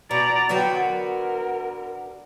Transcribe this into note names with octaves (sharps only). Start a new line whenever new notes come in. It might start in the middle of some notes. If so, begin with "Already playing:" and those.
B2 D5 A#5
D3 F#3 B3 F#4 G5
A#4